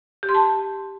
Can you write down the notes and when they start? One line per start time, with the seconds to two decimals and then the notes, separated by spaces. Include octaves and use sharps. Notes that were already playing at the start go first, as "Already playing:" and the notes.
0.23 G4
0.29 C6
0.34 A5